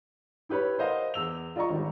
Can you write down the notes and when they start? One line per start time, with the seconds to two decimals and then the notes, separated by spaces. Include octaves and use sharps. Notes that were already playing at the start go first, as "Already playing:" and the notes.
0.49 E4 G4 B4 C#5 B5
0.78 A#4 C5 D#5 F5 F#5
1.14 E2 E6 F7
1.56 F4 D5 D#5 A#5 C#6
1.70 G#1 D#3 G3